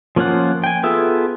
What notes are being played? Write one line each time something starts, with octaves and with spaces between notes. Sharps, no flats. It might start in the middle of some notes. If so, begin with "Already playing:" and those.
F3 A#3 C#4 F4 F#5
G5 G#5
B3 F4 G#4 A4 E5